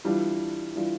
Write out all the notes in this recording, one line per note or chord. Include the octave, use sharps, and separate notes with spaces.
E3 G3 D4 F4
E3 G3 D4 F4